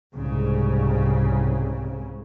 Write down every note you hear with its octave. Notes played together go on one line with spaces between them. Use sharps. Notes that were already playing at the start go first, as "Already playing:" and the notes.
C2 G#2 C#3